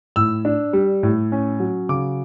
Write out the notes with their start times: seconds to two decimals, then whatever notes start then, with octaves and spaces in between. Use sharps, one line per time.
0.16 A2 E6
0.45 D4
0.73 G3
1.03 A2
1.32 C#4
1.60 F#3
1.89 C#3 D6